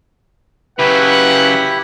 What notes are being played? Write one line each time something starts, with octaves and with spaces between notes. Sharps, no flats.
C#3 F#3 E4 G4 B4 F#5 B5